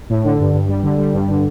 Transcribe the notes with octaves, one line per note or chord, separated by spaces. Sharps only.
A2
D3
G2
G2
G3
D3
G3
G2
D3